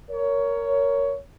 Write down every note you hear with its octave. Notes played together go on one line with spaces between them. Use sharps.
A#4 C#5